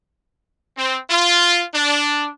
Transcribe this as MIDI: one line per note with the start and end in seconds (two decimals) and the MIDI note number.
0.78 0.98 60
1.10 1.63 65
1.74 2.29 62